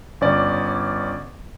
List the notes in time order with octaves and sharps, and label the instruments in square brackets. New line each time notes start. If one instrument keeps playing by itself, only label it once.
[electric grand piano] G1 C#4 D5